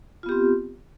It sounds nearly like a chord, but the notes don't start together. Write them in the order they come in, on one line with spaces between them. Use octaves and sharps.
F4 B3 G4 C4